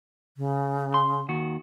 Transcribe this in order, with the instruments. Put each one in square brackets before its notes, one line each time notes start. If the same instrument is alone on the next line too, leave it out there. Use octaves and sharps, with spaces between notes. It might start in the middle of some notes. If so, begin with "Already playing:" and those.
[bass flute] C#3
[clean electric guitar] C6
D#2 D#3 F#4